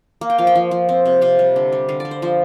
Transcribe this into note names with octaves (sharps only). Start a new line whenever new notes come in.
A#3
G5
F3 F5
G5
F3
F3
C4
C3
C3 F5
G3
D3
G3
D3 F5
G3 D5
C5
F3 C5